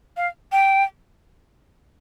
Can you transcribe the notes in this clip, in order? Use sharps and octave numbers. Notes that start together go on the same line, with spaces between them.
F5
G5